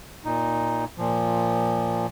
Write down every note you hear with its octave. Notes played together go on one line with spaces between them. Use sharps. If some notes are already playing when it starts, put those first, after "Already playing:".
A#2 D#4
A#2 F3